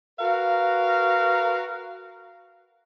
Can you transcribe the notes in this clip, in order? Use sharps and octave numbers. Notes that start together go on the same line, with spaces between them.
F#4 A#4 B4 F5